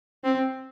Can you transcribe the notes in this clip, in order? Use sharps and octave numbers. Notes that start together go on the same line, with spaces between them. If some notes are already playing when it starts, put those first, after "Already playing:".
C4